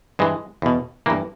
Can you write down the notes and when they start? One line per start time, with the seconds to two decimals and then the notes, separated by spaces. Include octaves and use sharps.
0.19 G2 E3 G#3
0.62 E2 B2
1.06 G2 E3 A#3